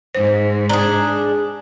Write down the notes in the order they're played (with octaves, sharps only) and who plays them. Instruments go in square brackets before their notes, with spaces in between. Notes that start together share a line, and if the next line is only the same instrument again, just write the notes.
[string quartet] G#2 [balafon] C5
[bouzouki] D4 G#4 [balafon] A#5